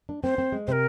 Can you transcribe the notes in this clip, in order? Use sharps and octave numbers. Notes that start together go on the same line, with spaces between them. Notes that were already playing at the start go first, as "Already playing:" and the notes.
D4
C4 C5
C4
G#3
C3 A#4 C5